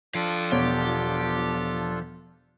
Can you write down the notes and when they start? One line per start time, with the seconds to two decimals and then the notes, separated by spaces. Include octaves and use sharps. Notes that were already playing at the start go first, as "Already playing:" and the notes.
0.15 F3 D4 F4 A4 F5 G5
0.52 E1 B2 G4 C#5